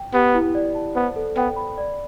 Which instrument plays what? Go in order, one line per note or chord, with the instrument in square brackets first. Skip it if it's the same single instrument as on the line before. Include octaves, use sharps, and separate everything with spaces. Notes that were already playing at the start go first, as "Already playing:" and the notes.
Already playing: [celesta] G5
[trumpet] B3 [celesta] G4
[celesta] E4
D5
A5
[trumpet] B3 [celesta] C5
[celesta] A4
[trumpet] B3 [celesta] G5
[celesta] B5
D5